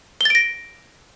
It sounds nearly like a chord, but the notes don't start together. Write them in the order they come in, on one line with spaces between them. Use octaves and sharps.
G7 A6 D7 A#6